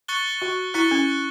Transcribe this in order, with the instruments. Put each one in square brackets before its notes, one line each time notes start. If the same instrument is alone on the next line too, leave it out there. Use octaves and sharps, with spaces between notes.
[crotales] C#6 F#6 A6 C#7 G7
[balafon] F#4
[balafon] E4 [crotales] C#6 F#6 A6 C#7 G7
[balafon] C#4